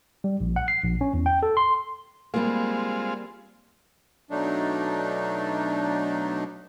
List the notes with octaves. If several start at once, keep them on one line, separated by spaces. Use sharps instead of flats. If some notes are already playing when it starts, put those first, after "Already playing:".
G3
A#1
F#5
C7
A#1
C#4
E2
G5
A4
C6
G3 G#3 A#3 C4 F4
B2 F#3 A3 D4 D#4